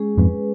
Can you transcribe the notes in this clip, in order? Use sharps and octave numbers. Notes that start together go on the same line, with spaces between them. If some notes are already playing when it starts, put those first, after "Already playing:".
Already playing: G#3 C#4 G#4
F2 G#2 B4